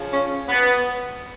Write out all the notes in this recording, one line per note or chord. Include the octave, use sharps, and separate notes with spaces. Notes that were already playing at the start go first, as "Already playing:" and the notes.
Already playing: C#3 F3
C#4
B3